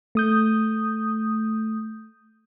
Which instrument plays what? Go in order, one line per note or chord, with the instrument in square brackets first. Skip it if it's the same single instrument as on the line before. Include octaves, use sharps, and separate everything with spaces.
[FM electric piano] A3 D#6 G6